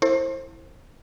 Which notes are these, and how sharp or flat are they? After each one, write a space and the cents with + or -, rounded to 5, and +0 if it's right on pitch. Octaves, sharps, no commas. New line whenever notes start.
E4 +0 A4 +45 C5 +25